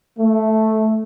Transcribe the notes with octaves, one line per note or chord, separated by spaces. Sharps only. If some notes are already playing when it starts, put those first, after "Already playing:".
A3